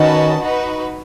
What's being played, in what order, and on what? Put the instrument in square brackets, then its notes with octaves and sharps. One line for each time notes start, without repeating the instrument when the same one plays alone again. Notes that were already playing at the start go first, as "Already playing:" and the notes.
Already playing: [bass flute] D#3 [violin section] C#4 F#4 B4 D#5 A5
[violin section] D#4 F#4 B4